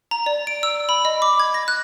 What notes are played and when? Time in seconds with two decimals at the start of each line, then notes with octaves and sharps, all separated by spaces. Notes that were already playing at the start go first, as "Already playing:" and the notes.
0.11 A#5
0.26 D5
0.47 D7
0.63 E6
0.89 B5
1.05 D#5
1.22 D6
1.40 G#6
1.54 A#6
1.68 F#6